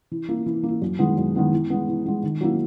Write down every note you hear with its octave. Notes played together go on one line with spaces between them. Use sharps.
E3
A#3 E4
E3
A#3
E4
F#2
D#3 G#3 B3 E4
F#2
D#3 G#3 B3 E4
E3
G#3 B3
E3
G#3 B3
D#3
F#3 A#3 E4